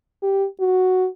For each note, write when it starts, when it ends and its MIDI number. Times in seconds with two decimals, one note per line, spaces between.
0.22 0.46 67
0.60 1.08 66